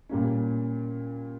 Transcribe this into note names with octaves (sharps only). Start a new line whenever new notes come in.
A#2 G3 A#3 C#4